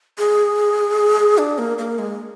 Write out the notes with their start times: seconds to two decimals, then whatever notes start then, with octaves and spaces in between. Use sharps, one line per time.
0.18 G#4
1.38 D4
1.58 A#3
1.78 A#3
1.99 G#3